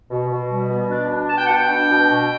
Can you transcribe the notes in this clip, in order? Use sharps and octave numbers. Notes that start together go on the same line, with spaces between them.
B2
B2
G3
B2
D4
D4
B2 A5
G5
F#5
B2 G5
D4
B2
B2